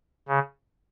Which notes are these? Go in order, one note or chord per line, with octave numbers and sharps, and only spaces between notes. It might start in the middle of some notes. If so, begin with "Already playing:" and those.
C#3